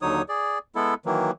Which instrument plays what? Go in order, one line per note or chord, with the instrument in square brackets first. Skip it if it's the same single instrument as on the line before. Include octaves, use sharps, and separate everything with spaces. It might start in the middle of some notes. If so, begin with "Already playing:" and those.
[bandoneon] D#2 D3 F#3 D#4 C#5 D#6
G#4 D5
G#3 B3 E4 A4
D#3 E3 F#3 A#3